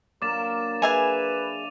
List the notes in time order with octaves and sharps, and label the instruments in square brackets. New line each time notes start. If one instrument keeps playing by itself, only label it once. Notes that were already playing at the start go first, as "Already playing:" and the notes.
[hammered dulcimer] F#3 A#3 D4 [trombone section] A#4 [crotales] D6 A6 E7
[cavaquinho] G#4 E5 G#5 [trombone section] B4 [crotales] D#7 F7